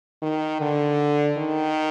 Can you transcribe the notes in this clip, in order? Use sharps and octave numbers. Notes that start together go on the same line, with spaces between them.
D#3
D3
D#3